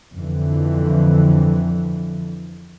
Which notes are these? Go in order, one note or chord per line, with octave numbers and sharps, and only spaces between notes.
F2 D3 E3